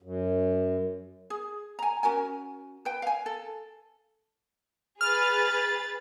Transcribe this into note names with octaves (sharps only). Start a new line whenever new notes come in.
F#2
G#4
G#5 A#5
C#4 F#4 A#4 G#5
B4 G5
F5 G#5
A4
G#4 B4 F6 A6